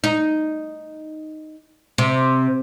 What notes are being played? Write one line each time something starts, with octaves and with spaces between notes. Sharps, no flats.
D#4
C3